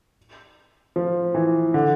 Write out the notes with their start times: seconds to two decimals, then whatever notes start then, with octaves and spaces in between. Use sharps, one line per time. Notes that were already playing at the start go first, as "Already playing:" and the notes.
0.96 F3
1.35 E3
1.74 D3